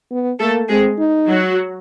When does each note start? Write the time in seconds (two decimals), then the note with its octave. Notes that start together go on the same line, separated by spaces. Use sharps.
0.12 B3
0.40 A3 A#3 A4
0.69 G#3 C4 G#4
0.98 D#4
1.27 F#3 F#4